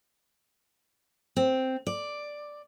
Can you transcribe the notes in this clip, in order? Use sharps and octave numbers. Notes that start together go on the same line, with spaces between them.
C4
D5